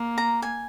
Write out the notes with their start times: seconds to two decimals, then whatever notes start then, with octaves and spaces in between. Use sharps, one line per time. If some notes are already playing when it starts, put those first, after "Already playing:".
Already playing: A#3
0.18 A#5
0.42 G#5